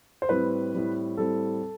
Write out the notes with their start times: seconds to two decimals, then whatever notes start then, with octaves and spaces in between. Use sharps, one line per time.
0.22 C5
0.29 A2 G3 C4 B4
0.73 A2 G3 C4
1.17 A2 G3 C4 A4